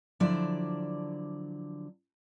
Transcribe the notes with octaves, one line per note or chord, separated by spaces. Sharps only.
D3 F3 F#3 E4 D5